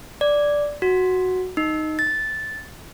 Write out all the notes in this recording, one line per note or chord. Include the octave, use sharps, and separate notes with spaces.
D5
F#4
D#4
A6